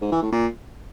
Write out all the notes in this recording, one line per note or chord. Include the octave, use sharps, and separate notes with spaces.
G#2
E3
A2
A#2